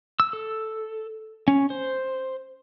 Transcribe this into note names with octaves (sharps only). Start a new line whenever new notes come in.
E6
A4
C#4
C5